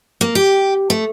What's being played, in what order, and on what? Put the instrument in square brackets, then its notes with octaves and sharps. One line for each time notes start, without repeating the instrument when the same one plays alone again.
[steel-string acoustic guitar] A#3
G4
A3